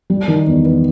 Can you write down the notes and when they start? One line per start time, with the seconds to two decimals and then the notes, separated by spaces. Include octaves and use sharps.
0.10 G3
0.28 D#3
0.47 E2
0.65 B3